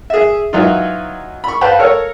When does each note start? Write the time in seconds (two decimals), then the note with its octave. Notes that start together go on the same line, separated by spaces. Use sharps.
0.10 G#4 E5
0.53 E3 F#3 D#4 F4
1.44 B5 C#6
1.61 B4 C5 F5 G5 A5 B5
1.79 A4 A#4 C#5